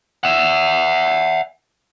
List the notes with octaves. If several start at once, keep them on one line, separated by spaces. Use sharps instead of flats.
E5 F#5